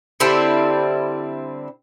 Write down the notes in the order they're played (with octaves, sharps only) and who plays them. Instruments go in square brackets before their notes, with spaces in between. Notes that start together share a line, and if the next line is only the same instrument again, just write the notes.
[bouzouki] D3 G3 C4 E4